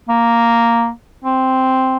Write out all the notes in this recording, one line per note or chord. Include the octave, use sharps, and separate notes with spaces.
A#3
C4